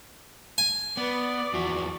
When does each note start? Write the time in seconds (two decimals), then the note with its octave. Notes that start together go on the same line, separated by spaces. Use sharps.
0.58 G#5
0.97 B3 B4 D5
1.54 E2 F3 E4 F#4